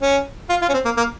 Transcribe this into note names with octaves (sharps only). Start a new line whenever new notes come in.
C#4
F4
F4
C#4
C4
A#3
A#3